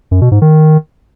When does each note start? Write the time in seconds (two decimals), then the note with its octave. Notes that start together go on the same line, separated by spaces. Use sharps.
0.11 F#2
0.21 B2
0.32 G#2
0.42 D#3